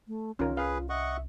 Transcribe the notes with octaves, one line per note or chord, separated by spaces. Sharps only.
A3
C2 D#3 C#4 F4 A#4
F4 G#4 B4 F5
D#5 E5 F#5 C#6